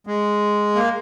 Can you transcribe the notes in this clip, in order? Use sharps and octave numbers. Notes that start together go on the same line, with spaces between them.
G#3
A#3